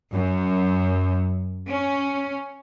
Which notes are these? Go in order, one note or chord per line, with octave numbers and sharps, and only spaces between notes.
F#2
C#4